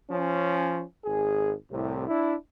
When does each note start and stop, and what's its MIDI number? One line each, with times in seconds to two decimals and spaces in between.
0.11 0.83 53
0.11 0.83 61
1.05 1.53 32
1.05 1.53 68
1.72 2.04 36
1.72 2.04 45
1.72 2.04 48
2.08 2.34 62
2.08 2.34 64